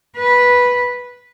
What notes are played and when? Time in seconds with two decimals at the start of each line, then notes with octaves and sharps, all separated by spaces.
0.17 B4